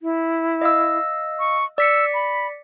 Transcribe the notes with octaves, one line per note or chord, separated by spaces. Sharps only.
E4
D#5 F5 E6
C#6
D5 E6 B6 C#7
B5